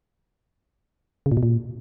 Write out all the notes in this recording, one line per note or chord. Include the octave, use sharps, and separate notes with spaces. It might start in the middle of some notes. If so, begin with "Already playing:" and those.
C#3
A#2
B2
A#2